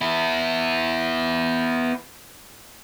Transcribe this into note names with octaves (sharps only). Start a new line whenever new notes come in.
B3 E4